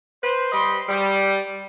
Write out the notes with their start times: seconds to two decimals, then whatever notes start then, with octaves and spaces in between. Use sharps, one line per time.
0.22 B4 C5
0.52 G3 D#5 B5 C6
0.88 G3